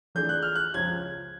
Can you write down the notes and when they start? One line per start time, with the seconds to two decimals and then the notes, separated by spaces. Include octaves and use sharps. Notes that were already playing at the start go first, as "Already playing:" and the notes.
0.15 E3 A3 D4 F4 G#4 G6
0.29 F#6
0.42 F6
0.55 F#6
0.74 C#2 C#3 F3 G#6